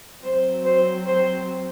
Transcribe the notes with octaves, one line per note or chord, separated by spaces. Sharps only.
F#3 C4 C5
C5
C5